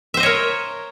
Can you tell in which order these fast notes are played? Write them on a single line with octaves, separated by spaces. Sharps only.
E5 C5 D#5 C#5 A#4